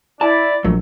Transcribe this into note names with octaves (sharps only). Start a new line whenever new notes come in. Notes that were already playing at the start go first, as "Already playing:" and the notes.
E4 D5 A5
A#1 F#3 A3